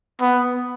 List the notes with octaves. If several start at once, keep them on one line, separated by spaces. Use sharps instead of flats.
B3